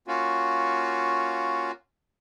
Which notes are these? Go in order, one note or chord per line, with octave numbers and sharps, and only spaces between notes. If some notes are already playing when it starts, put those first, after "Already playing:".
A#3 C#4 F4 F#4